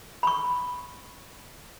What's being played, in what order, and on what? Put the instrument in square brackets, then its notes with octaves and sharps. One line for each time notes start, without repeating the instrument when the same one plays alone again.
[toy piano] B5 C#6